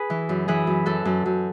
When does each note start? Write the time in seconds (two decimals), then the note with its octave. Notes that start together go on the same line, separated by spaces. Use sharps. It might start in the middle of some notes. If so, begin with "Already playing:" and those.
Already playing: G#4 B4
0.10 E3
0.29 F#2
0.48 E3 G#4 B4
0.67 F#2
0.86 F#2 F#4 A4
1.05 F#2
1.26 F#2